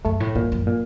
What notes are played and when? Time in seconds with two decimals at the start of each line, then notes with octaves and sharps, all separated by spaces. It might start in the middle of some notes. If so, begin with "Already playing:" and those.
0.05 F#2 A3
0.20 A2
0.35 G2 A#2
0.52 F#2
0.67 A#2